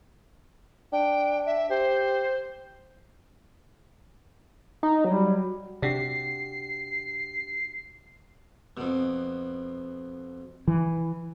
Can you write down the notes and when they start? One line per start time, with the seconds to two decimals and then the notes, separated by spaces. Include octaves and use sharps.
0.92 D4 G5
1.46 E5
1.70 G4 C5
4.83 D#4
5.05 F#3 G3
5.82 C3 D4 F#4 G4 C7
8.77 F2 B2
10.68 E3